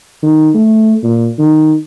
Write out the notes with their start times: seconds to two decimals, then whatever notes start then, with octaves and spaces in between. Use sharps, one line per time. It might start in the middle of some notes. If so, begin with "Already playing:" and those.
0.23 D#3
0.54 A3
1.03 A#2
1.39 D#3